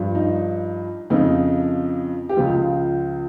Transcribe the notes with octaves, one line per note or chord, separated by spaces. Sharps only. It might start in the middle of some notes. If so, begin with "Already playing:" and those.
Already playing: G2 F3
D#4
F2 C#3 F3 D#4
G4
C#2 C#3 F3 F4